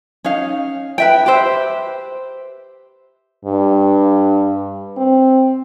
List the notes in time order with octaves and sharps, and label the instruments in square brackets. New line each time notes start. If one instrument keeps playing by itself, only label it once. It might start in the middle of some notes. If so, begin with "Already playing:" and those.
[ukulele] C#4 D#4 F5
B4 E5 G5
G4 B4 C5 E5
[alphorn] G2
C4